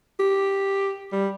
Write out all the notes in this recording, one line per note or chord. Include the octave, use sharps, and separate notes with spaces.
G4
G3